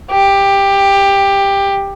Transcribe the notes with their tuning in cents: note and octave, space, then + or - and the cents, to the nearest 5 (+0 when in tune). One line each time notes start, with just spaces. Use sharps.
G4 +15